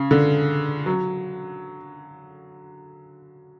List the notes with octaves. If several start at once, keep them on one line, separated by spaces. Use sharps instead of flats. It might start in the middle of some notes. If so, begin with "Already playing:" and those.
Already playing: C#3
D3
F#3